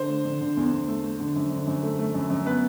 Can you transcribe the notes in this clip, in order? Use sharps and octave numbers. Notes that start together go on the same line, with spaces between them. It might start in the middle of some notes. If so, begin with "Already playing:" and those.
Already playing: D3 C5
A3
D3
D3
E2
E2
A3
A3
D3
F#2
D3
F#2
A3
A3
F#2
F#2
B3 B4